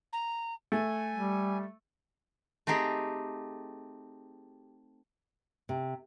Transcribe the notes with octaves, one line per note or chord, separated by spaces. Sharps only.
A#5
A3 G#5
G3
A3 C4 D#4 G4 G#4
C3